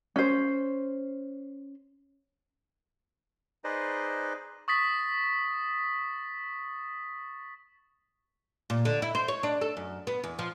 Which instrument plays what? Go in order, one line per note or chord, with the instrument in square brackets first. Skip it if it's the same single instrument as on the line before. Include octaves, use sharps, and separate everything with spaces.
[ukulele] C#4 C5
[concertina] D#4 G#4 B4 C5 D5 D#5
[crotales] C#6 D#6 A6 B6
[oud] A#2
D3
E4
C5
C#5
D4
A4
F#2
B3
E2
F3